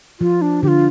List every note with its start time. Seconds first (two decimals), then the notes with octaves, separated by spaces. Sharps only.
0.20 F3 F4
0.42 D4
0.63 D3 G4
0.68 F4